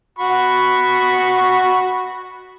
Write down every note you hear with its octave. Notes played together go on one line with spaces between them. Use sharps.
F#4 B5 C#6